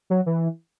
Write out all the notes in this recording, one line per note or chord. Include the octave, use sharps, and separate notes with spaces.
F#3
E3